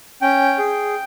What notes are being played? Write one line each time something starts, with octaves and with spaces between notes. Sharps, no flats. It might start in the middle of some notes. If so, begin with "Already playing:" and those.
C#4 G5
G#4